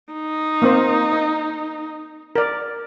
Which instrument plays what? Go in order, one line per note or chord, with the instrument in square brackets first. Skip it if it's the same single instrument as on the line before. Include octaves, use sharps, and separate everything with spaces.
[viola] D#4
[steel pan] A#3 C4 C5
D#5
A#4 D5